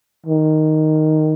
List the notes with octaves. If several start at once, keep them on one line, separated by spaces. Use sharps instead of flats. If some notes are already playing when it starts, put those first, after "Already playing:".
D#3